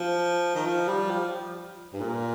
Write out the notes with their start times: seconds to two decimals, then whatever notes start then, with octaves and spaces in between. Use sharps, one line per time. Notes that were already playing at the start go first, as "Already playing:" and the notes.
Already playing: F3
0.55 D#3
0.66 F3
0.88 G3
1.10 F3
1.93 G2
2.01 A#2